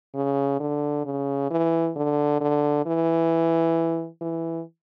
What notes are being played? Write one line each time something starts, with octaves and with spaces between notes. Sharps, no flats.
C#3
D3
C#3
E3
D3
D3
E3
E3